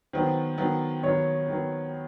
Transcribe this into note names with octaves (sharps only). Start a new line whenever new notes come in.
D#3 F#3 B3 C5
D#3 F#3 B3
D#3 F#3 B3 C#5
D#3 F#3 B3